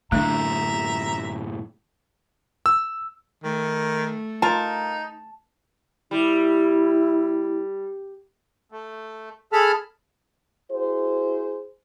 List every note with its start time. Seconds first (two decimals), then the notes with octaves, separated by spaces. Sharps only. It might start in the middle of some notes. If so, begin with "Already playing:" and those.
0.12 F#2 A2 D3 A3 D4 E5 A#5
2.66 E6
3.44 D#3 A3
4.42 D#4 F4 A#4 A5
6.11 G3 E4
8.72 A3
9.52 G#4 A4 A5 B5 F6
10.72 E4 F#4 G#4 C5